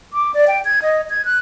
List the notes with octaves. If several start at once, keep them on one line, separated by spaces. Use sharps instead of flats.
D6
D5
G5
G#6
D#5
G#6
F#6